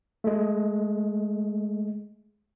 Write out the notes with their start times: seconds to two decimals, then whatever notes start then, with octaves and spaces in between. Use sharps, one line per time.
0.24 G#3 A3